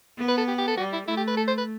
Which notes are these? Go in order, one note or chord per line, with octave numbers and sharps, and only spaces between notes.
B3
B4
A4
G4
G4
A4
G3 F#4
E4
A3 E4
G4
B4
A4
C5
B4